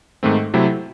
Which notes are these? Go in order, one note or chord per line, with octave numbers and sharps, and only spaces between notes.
G#2 D#3 A3 C4
C3 F#3 A3 C4 E4